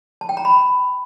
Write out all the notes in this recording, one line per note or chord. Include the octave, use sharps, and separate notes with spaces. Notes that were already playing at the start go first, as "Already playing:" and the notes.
A5
G5
A#5
B5